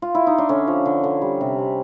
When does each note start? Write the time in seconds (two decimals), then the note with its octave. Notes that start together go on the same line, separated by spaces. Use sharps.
0.02 F4
0.15 E4
0.27 D#4
0.38 D4
0.49 D3 C#4
0.67 F3
0.86 D3
1.04 D3
1.22 G3
1.41 C3
1.58 C3